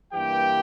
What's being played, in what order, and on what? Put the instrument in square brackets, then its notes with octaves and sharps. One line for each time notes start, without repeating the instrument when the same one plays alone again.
[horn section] G2 E3 A#3 G4 G5